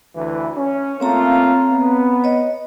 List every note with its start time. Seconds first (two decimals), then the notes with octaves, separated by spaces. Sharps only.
0.15 D2 E3
0.57 C#4
1.00 A3 A#3 C4 F4 C#5 A#5
1.72 B3
2.24 C#5 D#5